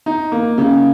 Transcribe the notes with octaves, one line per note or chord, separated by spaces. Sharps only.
D#4
A#3
C#3